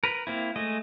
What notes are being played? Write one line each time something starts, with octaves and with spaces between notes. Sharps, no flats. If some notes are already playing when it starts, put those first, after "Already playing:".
A#4 B4
A#3 C4 E4
G#3 A3 D#5